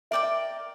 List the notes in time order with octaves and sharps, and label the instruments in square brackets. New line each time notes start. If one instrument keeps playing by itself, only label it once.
[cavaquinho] A#4 D5 G5 D6 [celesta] E5
[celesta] E5